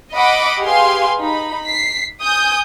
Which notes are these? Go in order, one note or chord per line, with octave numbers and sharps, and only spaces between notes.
D#5 F#5 B5 D6
G4 G#4 B4 F5 G#5 C6
D#4 B5
B6 C7
G#5 D#6 G6